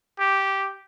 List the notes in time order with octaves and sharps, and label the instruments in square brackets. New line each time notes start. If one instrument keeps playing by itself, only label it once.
[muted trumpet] G4